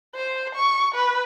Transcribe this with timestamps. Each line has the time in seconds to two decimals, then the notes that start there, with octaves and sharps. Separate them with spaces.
0.16 C5
0.56 C#6
0.95 B4